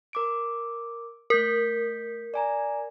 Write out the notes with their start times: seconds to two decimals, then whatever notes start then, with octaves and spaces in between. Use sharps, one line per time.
0.13 A#4 D6 D7
1.30 A3 A#4 G6 B6
2.34 D5 G#5 A#5